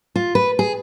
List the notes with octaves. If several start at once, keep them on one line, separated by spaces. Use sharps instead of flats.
F4
B4
G#4